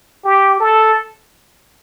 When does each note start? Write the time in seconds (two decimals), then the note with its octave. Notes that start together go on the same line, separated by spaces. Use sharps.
0.25 G4
0.60 A4